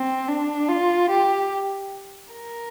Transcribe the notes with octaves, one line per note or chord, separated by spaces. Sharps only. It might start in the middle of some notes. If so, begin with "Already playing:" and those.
Already playing: C4
D4
F4
G4
A#4